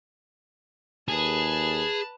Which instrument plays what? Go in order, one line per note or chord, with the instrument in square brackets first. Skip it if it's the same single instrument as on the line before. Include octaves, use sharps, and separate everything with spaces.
[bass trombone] D#2 [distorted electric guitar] G#4 [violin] B4 A5